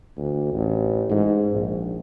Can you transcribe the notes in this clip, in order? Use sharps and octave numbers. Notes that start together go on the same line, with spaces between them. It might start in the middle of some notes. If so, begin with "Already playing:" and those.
D2
A1
G#2
A#1